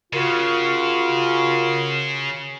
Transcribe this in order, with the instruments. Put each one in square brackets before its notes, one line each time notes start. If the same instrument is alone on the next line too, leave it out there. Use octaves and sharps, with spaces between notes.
[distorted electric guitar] C#3 [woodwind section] F4 F#4 A#4